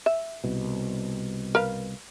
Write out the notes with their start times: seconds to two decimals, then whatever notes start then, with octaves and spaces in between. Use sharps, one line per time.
0.06 E5
0.44 C2 B2
1.55 A#4 B4 F5